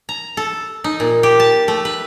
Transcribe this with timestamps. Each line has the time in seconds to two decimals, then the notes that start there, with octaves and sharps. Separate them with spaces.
0.09 A#5
0.37 A4
0.84 D#4
1.00 A#2
1.23 G4
1.40 A5
1.68 A3
1.85 B4